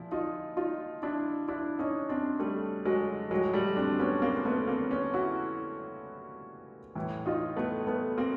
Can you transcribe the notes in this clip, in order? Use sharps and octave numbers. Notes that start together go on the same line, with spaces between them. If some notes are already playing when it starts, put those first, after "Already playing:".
Already playing: A#2 F3 E4
D#4 F4
D#4 F4
D4 E4
D4 E4
C#4 D#4
C4 D4
G3 A3
F#3 G#3
A2 F3 F#3 G#3
G3 A3
C4 D4
B3 C#4
A#3 C4
C4
A3 B3
A#3 C4
B3 C#4
E4 F#4
A2 E3
D#4 F4
A3 B3
A3 B3
A#3 C4